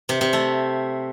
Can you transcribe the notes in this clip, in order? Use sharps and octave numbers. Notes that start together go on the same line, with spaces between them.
C3
C3
A3